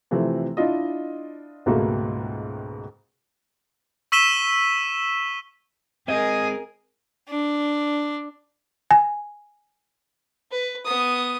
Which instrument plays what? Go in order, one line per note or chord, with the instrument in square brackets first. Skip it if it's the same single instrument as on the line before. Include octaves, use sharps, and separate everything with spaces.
[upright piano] C3 E3 F3 A3 C4
D4 E4 F4 D#5
C#2 G#2 B2 A3 A#3
[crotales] C#6 E6 B6 D#7 E7 G7
[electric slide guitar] G#3 C4 [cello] G#4 A#4 [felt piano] D#5 [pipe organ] G#5 D#6
[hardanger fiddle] D4
[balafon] G#5
[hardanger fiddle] B4
B3 D#6